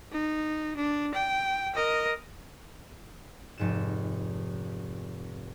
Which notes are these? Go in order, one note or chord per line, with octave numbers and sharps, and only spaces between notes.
D#4
D4
G5
A#4 D#5
F1 G#2 E7